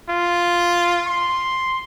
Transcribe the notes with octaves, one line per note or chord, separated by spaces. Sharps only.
F4
C6